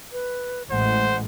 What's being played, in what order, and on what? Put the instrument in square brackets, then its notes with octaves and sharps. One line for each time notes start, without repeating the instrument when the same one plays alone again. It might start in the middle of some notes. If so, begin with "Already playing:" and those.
[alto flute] B4
[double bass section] A1 A2 G#3 [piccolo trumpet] C5 [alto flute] F#5